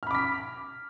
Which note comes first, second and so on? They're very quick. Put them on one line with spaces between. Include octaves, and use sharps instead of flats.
F6 B5 D6 B6